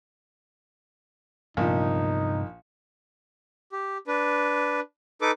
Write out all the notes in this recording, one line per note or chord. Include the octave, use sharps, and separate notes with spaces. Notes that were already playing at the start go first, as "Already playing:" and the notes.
A#1 G2 C3 F3 B3 D#4
G4
D4 B4
D#4 A4 B4 D6